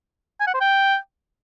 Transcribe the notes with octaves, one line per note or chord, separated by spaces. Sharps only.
G#5
F#5
C5
G5